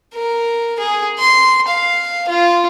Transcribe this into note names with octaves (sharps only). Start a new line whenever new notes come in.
A#4
G#4
C6
F5
F4